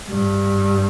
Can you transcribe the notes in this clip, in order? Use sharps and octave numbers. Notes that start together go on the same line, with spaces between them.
G2